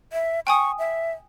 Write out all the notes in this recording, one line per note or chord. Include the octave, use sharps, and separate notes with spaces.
E5
G5 G#5 C#6 D#6
E5